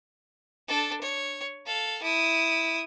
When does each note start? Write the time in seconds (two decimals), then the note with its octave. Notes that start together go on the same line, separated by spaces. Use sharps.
0.68 D4 A4
1.01 C#5
1.66 A4 F5
2.03 E4 D#6